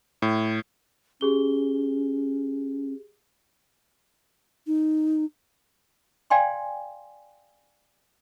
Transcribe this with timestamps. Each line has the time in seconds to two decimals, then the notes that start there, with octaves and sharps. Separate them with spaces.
0.22 A2
1.21 C#4 G4 G#4 G7
4.67 D#4
6.30 D5 F5 G5 G#5 C6